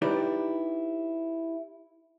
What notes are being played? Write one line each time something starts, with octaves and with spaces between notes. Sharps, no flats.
D#4 E4 G4 B4 D5